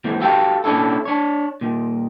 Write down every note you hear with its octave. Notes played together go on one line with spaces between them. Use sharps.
D#2 G#2 E3 A3 C4
F#4 G4 A4 F5 G5
A#2 C#4 D4 E4 A4
D4 C#5
A#2 D#3